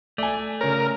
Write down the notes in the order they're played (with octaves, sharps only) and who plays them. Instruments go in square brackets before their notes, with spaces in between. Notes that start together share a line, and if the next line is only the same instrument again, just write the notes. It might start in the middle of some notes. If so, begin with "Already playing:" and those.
[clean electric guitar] A3 [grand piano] D5 G#5
[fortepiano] C#3 C#5 [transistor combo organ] A#4